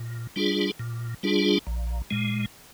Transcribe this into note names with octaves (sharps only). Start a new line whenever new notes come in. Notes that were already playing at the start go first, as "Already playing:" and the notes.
Already playing: A#2
G3 D4 F4 G#4
A#2
G3 D4 F4 G#4
A#1
A#2 G#3